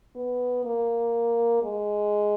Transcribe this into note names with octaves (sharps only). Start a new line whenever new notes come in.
B3
A#3
G#3